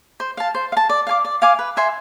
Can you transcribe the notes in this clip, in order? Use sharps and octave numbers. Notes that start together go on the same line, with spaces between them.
C5
F5 A5
C5
F5
A5
D5
F5 G#5 D6
D5
F5 G#5 D6
B4
E5 G#5 C6